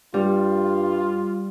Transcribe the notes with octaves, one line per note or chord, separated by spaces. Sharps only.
G2 G3 F4